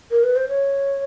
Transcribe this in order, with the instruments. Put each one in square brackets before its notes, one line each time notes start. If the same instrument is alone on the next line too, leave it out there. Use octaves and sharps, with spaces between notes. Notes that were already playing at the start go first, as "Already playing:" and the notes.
[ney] A#4
B4
C5
C#5